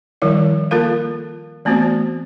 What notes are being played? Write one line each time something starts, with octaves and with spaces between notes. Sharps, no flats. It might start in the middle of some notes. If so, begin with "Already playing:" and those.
D#3 F3 G3 E4 A#4 D5
A#3 F4 A4 A#4 F5
E3 A3 B3 C4 F#4 C5